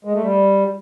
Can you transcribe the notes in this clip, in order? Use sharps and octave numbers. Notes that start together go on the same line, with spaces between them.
G#3
A3
G3